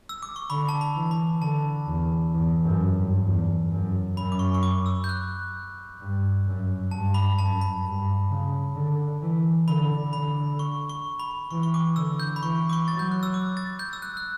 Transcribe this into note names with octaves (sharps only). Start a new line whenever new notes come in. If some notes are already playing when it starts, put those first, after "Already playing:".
E6
D6
C#6
D3 B5
A5
B5
E3
B5
D3 A5
E2
E2
F#2
G2
E2
F#2
F#2 B5
D6
C#6
C#6
D6
E6
G6
F#6
G2
F#2
G2 A5
B5
F#2 A5
B5
G2
C#3
D3
E3
D3 B5
D3 B5
C#6
C#6
B5
E3 C#6
C#6
D6
D3 E6
G6
B5
E3 C#6
D6
C#6
F#3 A6
G6
F#6
E6
D6
A6
G6
E6
F#6
F#6